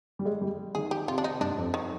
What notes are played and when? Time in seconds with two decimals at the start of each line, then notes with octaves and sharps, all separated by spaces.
0.19 G3
0.25 G#3
0.41 G3
0.75 D#3 G#4
0.91 G4
1.08 C3 F4
1.18 D4
1.24 D#4
1.41 G2 D4
1.58 F2
1.74 D#3